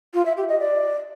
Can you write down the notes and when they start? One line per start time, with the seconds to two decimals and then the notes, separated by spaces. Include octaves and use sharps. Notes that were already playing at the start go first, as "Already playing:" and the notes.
0.14 F4
0.25 E5
0.37 G4
0.48 D#5
0.60 D5